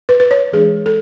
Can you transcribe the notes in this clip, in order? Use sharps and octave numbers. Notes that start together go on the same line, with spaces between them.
B4
B4
C#5
E3 G#3 D4 G#4
A4